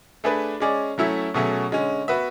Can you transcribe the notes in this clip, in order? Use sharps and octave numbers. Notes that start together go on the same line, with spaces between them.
A3 D4 G#4 B4
G#3 C#4 G#4 D5
F#3 A3 C#4 E4
B2 F#3 A3 C#4 G#4
D3 G#3 C#4
B3 F#4 B4 E5